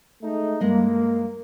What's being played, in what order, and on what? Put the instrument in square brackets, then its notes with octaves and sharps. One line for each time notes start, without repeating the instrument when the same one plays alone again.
[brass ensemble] G#3 A3 D#4
[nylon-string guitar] G2 G#3 D#5 [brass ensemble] A#3